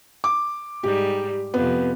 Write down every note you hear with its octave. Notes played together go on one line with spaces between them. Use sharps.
D6
G#2 G3 G4
F2 C3 B3